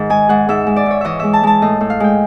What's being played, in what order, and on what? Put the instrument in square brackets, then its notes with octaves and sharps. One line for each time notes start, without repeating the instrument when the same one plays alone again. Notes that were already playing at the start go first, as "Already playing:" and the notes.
Already playing: [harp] G#2 D#3
G#3 G#5
G#2 F#5
G#2 E5
G#3
D5
G#2 C#5
E3 D#5 E5
G#3 E5
A5
G#3 A5
A2 D#5
A2
F5
G#3 G5